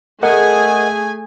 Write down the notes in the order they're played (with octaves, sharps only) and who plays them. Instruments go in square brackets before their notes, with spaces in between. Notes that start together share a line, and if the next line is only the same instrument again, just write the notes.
[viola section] A3 G#4 G#5 [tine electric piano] A#4 D#5 F#5